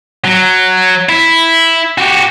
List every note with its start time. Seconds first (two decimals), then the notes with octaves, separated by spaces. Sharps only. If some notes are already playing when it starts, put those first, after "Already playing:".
0.24 F#3
1.09 E4
1.98 F#4 G4